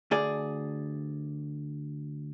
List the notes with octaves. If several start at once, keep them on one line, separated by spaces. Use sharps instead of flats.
D2 G#4 D5